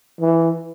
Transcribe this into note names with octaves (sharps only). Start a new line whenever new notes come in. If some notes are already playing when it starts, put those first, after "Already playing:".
E3